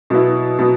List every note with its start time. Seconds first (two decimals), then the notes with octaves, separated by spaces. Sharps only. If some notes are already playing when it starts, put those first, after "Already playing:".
0.10 B2 F#3 B3 E4
0.59 B2 F#3 B3